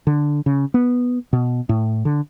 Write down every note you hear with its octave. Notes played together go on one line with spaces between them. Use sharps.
D3
C#3
B3
B2
A2
D3